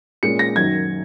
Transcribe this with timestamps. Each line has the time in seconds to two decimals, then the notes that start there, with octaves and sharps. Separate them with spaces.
0.23 A#2 G#3 C#4 C#7
0.39 A#6
0.56 F#2 D#3 F#3 G#6